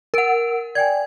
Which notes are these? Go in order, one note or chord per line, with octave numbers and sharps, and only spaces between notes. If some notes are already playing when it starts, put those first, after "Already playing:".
A#4 F#5 E6 D7
D5 G5 G#5 G#6